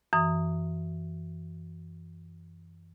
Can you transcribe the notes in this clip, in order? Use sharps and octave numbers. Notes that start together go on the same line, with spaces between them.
F#2 E3 D#6